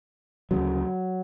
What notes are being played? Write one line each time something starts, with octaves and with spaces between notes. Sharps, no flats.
D2 C#3 F#3